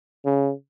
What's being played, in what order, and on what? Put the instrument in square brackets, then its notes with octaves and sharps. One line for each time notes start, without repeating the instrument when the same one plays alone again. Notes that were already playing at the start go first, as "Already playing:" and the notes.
[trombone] C#3